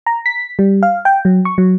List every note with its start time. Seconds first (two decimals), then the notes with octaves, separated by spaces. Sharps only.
0.07 A#5
0.26 B6
0.59 G3
0.83 F5
1.05 G5
1.25 F#3
1.45 C#6
1.58 F#3